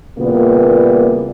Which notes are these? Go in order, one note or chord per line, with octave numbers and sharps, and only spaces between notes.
A#2 C#3 E3 G3 A#3 B3